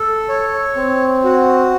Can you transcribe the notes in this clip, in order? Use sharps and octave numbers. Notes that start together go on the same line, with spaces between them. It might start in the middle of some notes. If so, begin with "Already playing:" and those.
Already playing: A4
C#5
C4
F#4